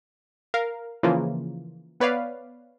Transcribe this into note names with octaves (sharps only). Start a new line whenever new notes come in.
A#4 F5
C#3 E3 F3 A#3 F4
B3 B4 C#5 D5 F5